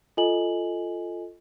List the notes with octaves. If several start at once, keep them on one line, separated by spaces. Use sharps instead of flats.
F4 A4 D#5 G#5 F#7